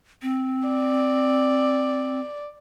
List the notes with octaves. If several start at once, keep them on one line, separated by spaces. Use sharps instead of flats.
C4
D5